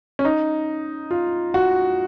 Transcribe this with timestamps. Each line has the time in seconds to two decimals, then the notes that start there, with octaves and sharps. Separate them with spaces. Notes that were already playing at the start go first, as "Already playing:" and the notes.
0.19 C#4
0.25 D#4
1.11 F4
1.54 F#4